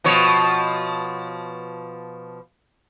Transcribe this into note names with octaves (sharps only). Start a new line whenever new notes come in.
B2 F3 C#5